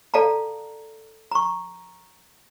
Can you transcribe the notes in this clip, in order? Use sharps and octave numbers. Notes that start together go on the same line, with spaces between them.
A4 D5 F5 A5 A#5
A#5 C#6